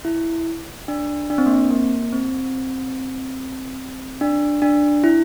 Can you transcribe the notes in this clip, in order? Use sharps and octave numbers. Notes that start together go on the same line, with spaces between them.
E4
D4
D4
C4
A#3
C4
A#3
C4
D4
D4
E4